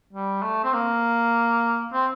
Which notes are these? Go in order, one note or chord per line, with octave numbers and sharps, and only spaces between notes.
G3
A3
C4
A#3
C4